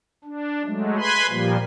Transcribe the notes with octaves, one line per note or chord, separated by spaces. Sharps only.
D4
F#3 G#3 A3
B4 G#5 B5 C6
A#2 F3 G3 A#3